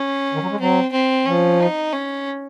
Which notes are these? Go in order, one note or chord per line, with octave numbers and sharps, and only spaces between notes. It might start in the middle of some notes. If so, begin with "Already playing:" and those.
Already playing: C#4
D#3
F#3
G#3
F#3 C4
C4
F3 C#4
D#4
C#4